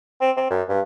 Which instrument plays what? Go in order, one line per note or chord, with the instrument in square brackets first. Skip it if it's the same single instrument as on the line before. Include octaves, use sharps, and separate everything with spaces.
[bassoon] C4
C4
F#2
G2